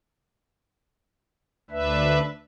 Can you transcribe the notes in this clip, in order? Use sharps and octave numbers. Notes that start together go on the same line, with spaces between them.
D2 D4 B4 E5